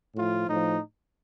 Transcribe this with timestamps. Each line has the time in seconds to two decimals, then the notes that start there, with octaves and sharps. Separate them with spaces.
0.15 A2 F3 F4
0.47 A2 F3 D#4